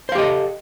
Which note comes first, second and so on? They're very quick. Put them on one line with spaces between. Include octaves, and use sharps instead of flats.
C5 F5 G4 D#5 A4